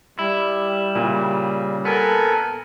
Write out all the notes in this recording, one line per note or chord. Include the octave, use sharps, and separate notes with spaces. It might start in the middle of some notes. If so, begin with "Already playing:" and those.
G3 E4
A#2 C#3
B3 A4 A#4 G#5